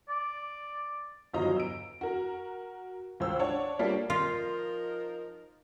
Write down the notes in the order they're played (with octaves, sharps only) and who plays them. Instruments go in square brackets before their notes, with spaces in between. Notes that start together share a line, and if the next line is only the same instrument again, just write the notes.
[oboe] D5
[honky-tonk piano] G1 E2 F#3 F4 D#5 A#5
E6 D7
F#4 A#4
C#2 C5 E6
D4 C#5 F#5 A5
G3 A#3 D4 F4 G4 A4
[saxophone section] F3 D#4 A#4 [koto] F4